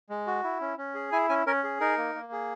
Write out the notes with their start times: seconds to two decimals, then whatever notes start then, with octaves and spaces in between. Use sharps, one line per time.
0.10 G#3
0.27 F#4
0.43 E4
0.61 C#4
0.78 C#4
0.94 G#4
1.12 E4 G#5
1.29 C#4 G#5
1.47 C#4 A#4
1.64 G#4
1.80 D#4 A#4
1.98 A#3
2.15 A#3
2.32 G#4